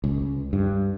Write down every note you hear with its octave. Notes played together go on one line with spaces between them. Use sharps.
C#2
G2